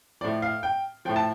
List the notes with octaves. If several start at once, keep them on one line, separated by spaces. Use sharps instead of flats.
A2 F3 D5
F5
G5
A2 F3 G5
A5